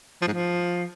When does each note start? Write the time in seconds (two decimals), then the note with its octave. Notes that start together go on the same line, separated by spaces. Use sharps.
0.22 F3
0.27 G#2
0.33 F3